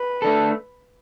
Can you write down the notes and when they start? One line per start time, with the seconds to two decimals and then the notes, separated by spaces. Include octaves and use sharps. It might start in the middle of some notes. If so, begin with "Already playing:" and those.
Already playing: B4
0.22 A3 D4 A4